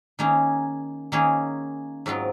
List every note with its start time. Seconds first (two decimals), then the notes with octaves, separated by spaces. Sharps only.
0.19 D#3 A#3 C#4 G#4
1.12 D#3 A#3 C#4 G#4
2.06 G#2 F#3 C4 F4 A#4